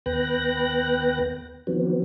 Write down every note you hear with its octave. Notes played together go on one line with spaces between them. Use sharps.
D#2 B3 B4 G5 F#6 A#6
D#3 F3 F#3 B3 C4